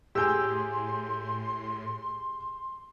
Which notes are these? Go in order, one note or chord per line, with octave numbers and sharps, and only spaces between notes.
A2 G4 G#4 C6 E6 G6